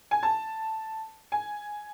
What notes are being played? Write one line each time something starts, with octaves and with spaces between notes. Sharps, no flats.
G#5
A5
G#5